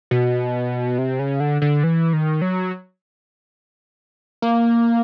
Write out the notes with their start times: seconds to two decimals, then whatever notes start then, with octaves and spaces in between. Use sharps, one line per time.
0.11 B2
0.98 C3
1.19 C#3
1.40 D3
1.62 D3
1.83 E3
2.13 D#3
2.41 F#3
4.42 A#3